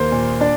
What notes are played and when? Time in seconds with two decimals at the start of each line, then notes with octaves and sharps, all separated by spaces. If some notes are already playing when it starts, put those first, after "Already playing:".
Already playing: D#2 A#3 C5
0.12 A#2
0.40 D4 D5